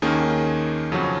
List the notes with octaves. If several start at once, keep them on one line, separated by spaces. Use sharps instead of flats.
D#2 D#3 A#3 C#4 G#4
F2 C#3 F#3 C#4 F#4